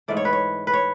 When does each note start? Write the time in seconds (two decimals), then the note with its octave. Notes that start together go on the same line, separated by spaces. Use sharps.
0.08 G#2 E3 A3 D5
0.17 C#5
0.25 B4
0.33 C#5
0.67 B4
0.74 C#5